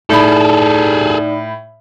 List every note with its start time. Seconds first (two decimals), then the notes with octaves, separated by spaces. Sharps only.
0.10 A2 D#4 G#4 A4 D5 B5